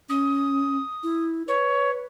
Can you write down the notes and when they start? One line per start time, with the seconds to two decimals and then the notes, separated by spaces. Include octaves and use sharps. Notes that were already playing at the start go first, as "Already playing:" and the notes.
0.09 C#4 D#6
1.03 E4
1.47 B4 C#5